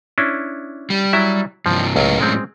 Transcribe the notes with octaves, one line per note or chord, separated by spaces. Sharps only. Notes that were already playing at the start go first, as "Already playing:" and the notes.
C#4 D4 E4
G3
F#3 E4 E5
G2 C3 F3
C#2 A2 F#3 C#4
G#3 C4